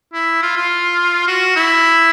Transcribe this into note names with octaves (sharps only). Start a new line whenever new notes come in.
E4
F4
F4
F#4
E4